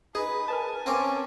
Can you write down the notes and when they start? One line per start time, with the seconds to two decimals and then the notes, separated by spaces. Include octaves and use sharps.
0.15 D#4 G#4 B4
0.48 A#4 B4 G#5 A5
0.86 C4 C#4 F5 D6